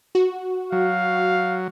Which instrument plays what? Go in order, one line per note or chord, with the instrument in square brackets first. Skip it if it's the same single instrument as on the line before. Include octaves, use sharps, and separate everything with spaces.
[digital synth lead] F#4
[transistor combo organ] F#3 [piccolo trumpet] F5